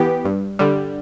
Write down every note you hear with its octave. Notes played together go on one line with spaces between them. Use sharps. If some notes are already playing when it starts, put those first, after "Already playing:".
Already playing: E3 B3 G4
G2
D3 G3